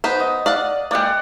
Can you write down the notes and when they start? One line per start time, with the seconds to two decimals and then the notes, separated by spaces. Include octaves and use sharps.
0.04 B3 D#4 C5
0.20 D#5
0.46 D5 F5 F#5
0.91 G#3 A#3 D5 F#5 G5